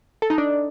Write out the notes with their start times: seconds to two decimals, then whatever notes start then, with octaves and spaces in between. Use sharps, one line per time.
0.22 A4
0.30 D#4
0.38 D4